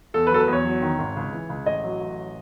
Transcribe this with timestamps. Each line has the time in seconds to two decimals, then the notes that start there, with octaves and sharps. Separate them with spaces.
0.14 E2 A4
0.27 B4
0.31 F#3 A4
0.40 B4
0.48 E2
0.53 C#5
0.65 F#3
0.82 D#3
0.99 G#1
1.16 C#2
1.33 E3
1.49 C#2
1.66 A1 D#5
1.84 F#3
2.01 A1